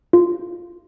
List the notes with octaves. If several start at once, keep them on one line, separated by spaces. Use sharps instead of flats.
F4